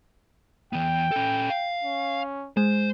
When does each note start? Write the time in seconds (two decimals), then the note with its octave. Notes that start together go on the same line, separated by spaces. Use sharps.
0.73 E3 B3 G5
1.12 C#4 A4
1.50 F5
1.83 C#4
2.57 G#3 C5